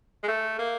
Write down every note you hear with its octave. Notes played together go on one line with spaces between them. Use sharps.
G#3
A3
A#3